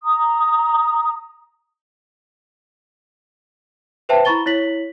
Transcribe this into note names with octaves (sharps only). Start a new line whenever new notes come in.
A#5 D#6
B4 C5 E5 G5 A5
E4 A#5 B5 C#6 A6 G7
E4 C#5 B6 F#7